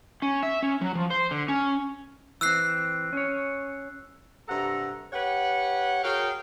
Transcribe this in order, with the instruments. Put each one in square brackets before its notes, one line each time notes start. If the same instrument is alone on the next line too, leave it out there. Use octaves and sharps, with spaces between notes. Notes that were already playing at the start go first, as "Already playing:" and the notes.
[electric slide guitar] C#4
E5
C#4
F#3
F3
C5
D3
C#4
[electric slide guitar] E3 C4 [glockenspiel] E6 F#6 C7
[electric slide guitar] C#4 C#5
[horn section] G2 C3 A4 F#5 A#5
G4 B4 C#5 F#5
F#4 G#4 A#4 C#5 F5 G5